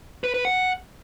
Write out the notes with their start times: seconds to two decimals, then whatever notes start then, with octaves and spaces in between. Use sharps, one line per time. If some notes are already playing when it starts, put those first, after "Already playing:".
0.24 B4
0.34 B4
0.45 F#5